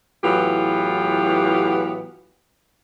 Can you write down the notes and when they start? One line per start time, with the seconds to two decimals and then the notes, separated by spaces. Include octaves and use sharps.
0.24 A2 E3 F#3 B3 F4 G4